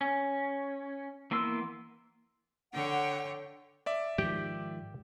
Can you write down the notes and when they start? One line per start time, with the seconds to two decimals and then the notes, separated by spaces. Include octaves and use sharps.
0.01 C#4
1.31 E3 A#3 B3 C6 E6
2.74 D3 C#5 F#5 G5
3.86 D5 E5 D6
4.18 G#2 D#3 F3 G4 G5